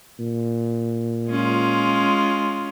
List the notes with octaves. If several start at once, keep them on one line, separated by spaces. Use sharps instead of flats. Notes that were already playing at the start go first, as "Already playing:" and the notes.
A#2
G#3 C#4 F4